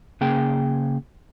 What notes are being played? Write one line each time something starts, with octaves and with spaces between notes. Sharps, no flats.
C#3 A#3 G#4 G5